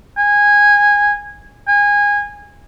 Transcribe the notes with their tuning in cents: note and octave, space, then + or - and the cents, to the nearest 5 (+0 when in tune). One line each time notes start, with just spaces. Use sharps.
G#5 -15
G#5 -20